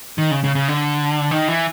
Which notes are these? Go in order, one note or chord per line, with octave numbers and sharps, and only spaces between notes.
D#3
C#3
C#3
C#3
D3
D#3
E3